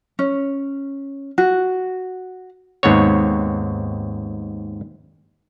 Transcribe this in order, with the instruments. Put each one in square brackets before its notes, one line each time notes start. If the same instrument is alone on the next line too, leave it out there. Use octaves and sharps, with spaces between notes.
[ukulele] C#4
F#4
[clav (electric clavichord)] D#2 G#2 B3 C4 C#5